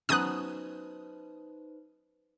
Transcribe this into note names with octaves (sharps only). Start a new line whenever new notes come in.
F#3 B3 C#4 D#4 B4 C5 D#6 F#6